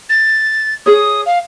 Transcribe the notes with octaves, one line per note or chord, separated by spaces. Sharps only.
A6
G#4 C#5 D#6
F5